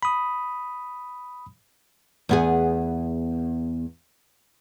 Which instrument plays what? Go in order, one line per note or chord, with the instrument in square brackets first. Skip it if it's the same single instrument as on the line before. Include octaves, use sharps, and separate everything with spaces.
[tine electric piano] B5 D#6
[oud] E2 B3 G#4